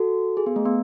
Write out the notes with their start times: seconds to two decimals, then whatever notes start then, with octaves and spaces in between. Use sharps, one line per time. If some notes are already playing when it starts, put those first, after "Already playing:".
Already playing: F#4 A4
0.37 G#4
0.46 B3
0.56 A3
0.65 B3